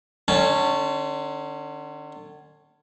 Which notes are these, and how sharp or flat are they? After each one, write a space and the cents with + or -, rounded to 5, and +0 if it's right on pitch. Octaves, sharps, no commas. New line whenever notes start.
D3 +35 C#4 +0 A5 -25